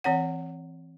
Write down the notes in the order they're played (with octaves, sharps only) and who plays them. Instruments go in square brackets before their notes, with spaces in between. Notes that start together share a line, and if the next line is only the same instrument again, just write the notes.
[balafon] E3 C4 C#5 F#5